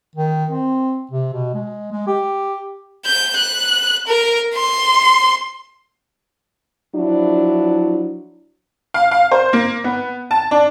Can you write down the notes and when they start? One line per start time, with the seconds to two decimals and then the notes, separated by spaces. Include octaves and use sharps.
0.15 D#3
0.51 C4
1.11 C3
1.34 B2
1.54 G#3
1.92 G#3
2.07 G4
3.05 G6
3.36 F#6
4.07 A#4
4.54 C6
6.96 F3 F#3 D4 E4
8.94 F5
9.11 F5
9.31 C5
9.53 A#3
9.84 B3
10.31 A5
10.51 D4